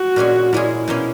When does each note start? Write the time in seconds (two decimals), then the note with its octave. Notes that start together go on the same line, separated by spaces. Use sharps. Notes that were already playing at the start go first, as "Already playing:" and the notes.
Already playing: F#4
0.16 A#2 G#3 C#4 G#4
0.52 A#2 G#3 C#4 E4 G#4
0.88 B2 A#3 C#4 G#4